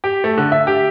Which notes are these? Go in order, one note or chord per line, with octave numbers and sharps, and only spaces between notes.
G4
A3
D3
E5
G4